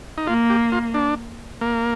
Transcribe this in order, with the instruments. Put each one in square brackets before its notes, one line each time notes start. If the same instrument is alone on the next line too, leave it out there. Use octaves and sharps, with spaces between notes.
[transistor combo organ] D#4
[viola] A#3 [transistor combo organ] F4
[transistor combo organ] G4
F4
D4
A#3